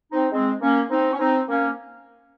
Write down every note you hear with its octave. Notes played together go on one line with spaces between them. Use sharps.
C4 D#4
G#3 C4
A#3 C#4
C4 D#4
C#4
C4 D#4
A#3 C#4